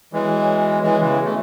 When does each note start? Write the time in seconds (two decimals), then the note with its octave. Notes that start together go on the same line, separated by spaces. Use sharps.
0.13 E3 F#3 G#3 B3 F#4 C#5
0.83 E3 G#3
1.00 C#3 E3
1.25 A3